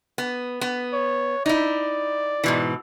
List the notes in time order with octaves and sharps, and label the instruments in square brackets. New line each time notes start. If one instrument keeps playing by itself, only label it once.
[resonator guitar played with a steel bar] B3
B3
[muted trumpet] C#5
[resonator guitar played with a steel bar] D#4 E4 [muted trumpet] D5
[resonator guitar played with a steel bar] G#2 B2 E3